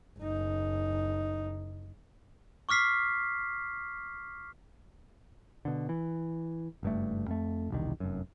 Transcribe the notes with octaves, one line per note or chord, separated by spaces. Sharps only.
F#1 D#4
C#6 D6 F6 B6 C7
B2 D3
E3
F#1 G2 A3
F2 A3
E1 C2 D#3
F1 F#2